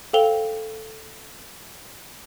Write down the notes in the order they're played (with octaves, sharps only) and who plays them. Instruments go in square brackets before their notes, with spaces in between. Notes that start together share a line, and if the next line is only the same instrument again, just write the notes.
[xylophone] A4 C5 F5 G5 F7 G7